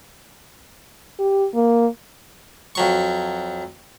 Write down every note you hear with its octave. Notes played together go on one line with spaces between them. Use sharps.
G4
A#3
F2 F#3 C#6